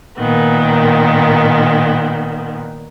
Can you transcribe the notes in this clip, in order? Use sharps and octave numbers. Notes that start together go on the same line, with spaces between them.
A#2 D#3 B3